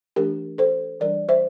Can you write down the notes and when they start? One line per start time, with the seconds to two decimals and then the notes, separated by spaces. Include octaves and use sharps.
0.16 E3 A3 D4 G4 A#4
0.58 A4 C5
1.00 E3 G3 D4 A#4 D5
1.29 C5 E5